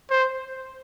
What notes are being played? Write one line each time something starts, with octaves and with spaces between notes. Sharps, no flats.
C5